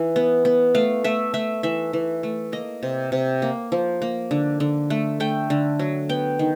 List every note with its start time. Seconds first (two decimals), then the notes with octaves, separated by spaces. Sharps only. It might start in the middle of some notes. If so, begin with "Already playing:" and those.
Already playing: E3
0.16 B3
0.45 B3
0.74 A3 F5
1.04 A3 E5
1.34 A3 E5
1.63 E3 E5
1.93 E3
2.23 A3
2.52 A#3 D#5
2.83 C3
3.12 C3
3.42 A#3
3.72 F3
4.02 A#3
4.31 D3
4.60 D3
4.90 A3
5.20 A3 G5
5.50 D3
5.79 F#3
6.09 B3 G5
6.39 D#3